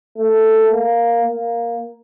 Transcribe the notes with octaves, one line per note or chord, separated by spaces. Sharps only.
A3
A#3
A#3